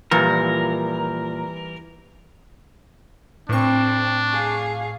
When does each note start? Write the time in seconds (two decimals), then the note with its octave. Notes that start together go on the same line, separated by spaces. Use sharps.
0.11 A#2 E3 F3 G3 A#4
3.49 A2 C4 D4 C#6
4.33 G#4 F5